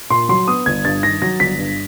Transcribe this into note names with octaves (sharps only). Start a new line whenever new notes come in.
A#2 C6
F#3 C6
B3 D#6
G1 G#6
G2 A6
D#3 A#6
F#3 A#6
G1 B6
G2